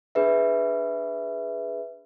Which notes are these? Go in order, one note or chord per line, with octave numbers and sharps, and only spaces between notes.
D4 G#4 B4 E5